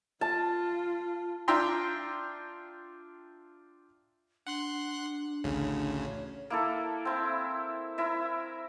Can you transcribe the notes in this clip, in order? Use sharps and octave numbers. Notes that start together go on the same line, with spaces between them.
F4 A5
D4 F4 E5 G5 A#5 C6
D4 F#5 C6 F#6
A1 D2 C#3
C#5
A#3 E4 A4
C4 E4
E4 A#4 E5